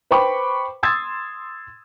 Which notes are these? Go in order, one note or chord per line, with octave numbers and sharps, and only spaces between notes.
B4 C5 G5 B5 C#6 D6
C6 D#6 E6 G#6 A6